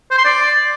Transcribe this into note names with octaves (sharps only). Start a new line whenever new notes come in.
C5
C6
D5